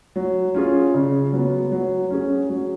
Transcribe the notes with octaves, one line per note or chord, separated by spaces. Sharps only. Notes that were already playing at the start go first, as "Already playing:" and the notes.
F#3
C#4 F4 G#4
C#3
F#3 B3
F#3
C#4 G#4
F#3